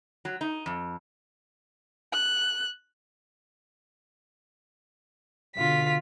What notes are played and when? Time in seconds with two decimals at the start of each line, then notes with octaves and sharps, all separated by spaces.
0.25 F#3
0.41 D#4
0.66 F2
2.13 F#6
5.56 B2 D3 F4 B6